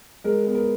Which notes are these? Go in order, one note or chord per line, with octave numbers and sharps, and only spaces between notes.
G#3 A#4
B3
A#4